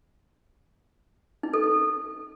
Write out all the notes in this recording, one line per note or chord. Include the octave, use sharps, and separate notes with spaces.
D#4
A4
A4